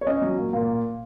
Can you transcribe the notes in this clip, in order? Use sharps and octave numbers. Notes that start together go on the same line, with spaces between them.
C#5
C#4 D#5
F#3
A#2
A#2